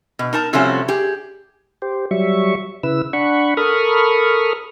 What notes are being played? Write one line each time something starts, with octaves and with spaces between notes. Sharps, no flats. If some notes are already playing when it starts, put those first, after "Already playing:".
B2
D#4 A#4 A5 A#5
C3 F3 G3 A3 C#4 F#4
G4 G#4
G4 C5
F#3 G3 E5 C#6
C#3 E4 B4 E6
D4 F#5 B5 C#6
A4 A#4 B5 C#6 D#6 F6